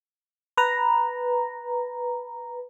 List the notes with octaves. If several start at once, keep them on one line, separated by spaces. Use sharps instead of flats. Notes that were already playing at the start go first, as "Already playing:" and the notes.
B4 A#5